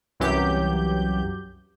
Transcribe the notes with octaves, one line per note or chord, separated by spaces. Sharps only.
C2 F#2 E3 F#3 G4 G6